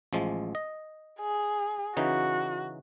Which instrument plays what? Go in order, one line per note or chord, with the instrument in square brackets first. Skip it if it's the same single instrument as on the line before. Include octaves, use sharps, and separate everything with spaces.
[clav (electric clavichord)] A1 F3 G#3
D#5
[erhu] G#4
[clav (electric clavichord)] C#3 E3 D#4 [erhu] F#4